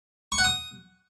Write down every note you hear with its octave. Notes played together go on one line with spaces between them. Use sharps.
C#6
F#5
D#6